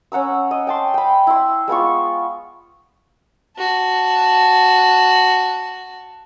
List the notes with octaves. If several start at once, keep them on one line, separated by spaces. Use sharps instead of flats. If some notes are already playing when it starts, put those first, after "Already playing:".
C#4 F#5 A#5 E6
D#5
G5 A5 C6
G5 B5
E4 C6
G#3 B3 F4 C#6
F#4 A5